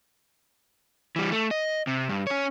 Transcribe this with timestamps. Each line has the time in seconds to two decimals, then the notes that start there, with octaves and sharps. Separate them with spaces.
1.16 E3 G3
1.32 A3
1.51 D#5
1.87 C3
2.09 G2
2.27 C#4 C#5